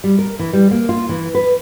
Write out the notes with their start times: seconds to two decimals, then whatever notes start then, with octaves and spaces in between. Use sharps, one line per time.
0.04 G3
0.19 A#4
0.39 E3
0.53 G3
0.71 A#3
0.89 F4
1.09 E3
1.35 B4